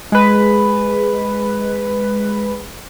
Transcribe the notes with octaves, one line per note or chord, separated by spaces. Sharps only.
G#3 B4